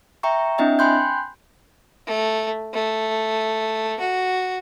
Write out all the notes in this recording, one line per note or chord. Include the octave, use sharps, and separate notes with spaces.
E5 G5 A#5 C#6
C4 D4 E4 D#5 E5 G5
G5 G#5 B5 C6 F#6 G6
A3
A3
F#4